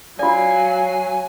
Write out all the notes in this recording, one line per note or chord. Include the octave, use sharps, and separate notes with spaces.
F#3 F4 D5 F5 G#5